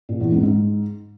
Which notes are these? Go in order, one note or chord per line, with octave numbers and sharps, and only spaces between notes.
A#2
E2
G#2
G#2